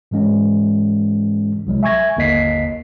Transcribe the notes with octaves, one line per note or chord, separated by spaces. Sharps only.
G#2 E3 G#3 C#4
C2 F#3 G#3
E5 G#5 C#6 G#6 A#6
G1 D#2 A#3 D#5 B6 C7